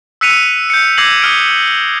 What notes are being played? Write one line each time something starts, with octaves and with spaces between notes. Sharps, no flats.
E6 F#6 B6 C#7 D#7 F7
G6 C#7
D6 E6 G#6 A#6 C7 F#7
D#6 F6 D7